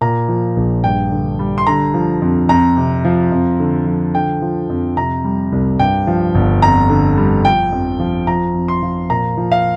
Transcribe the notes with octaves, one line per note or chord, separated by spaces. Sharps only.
A#2 A#5
F3
A#1
G2 G5
D3
G3
C6
D3 A#5
F3
F2
F2 A#5
C3
F3
F2
D3
F3
D3 G5
F3
F2
C3 A#5
G3
C2
G2 G5
F3
G1
F2 A#5
D3
G3
F3 G5
F2
F3
F3 A#5
F2
C6
F3
A#2 A#5
F3
F5